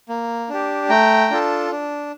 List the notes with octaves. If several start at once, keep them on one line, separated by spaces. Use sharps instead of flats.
A#3
D4 G4
A3 G5 A#5
D4 F4 A4
D4